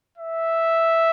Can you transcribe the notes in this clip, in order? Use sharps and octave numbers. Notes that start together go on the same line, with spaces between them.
E5